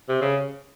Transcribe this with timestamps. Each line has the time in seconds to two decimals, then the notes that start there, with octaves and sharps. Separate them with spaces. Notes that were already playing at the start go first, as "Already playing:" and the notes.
0.09 C3
0.21 C#3